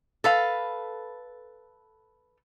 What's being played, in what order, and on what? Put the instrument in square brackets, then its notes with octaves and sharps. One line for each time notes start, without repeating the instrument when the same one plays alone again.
[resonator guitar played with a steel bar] A4 B4 F5